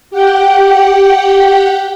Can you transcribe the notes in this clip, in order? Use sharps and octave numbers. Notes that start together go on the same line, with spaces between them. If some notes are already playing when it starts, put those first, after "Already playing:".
G4 F#5 G5